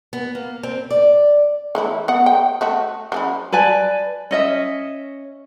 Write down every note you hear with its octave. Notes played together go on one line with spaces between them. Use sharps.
B3
A#3
C4
D5
E3 A3 E4
B3 F#5
G5
A3 F#4 E5
F#3 C#4 E4
B4 D5 G#5 A5
C#4 D#5 E5